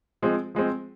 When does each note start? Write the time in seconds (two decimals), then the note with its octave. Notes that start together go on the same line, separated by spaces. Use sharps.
0.22 F3 G#3 C4
0.55 F3 G#3 C4